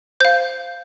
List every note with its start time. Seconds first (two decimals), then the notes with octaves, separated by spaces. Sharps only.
0.20 C5 F5 G6